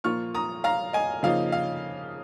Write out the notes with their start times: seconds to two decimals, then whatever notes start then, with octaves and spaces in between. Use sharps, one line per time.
0.04 A#2 F3 A#3 F4 C#6 F6
0.35 A#5 D#6
0.64 F5 A#5
0.93 D#5 G#5
1.23 C#3 F3 A#3 D#4 F5
1.52 F5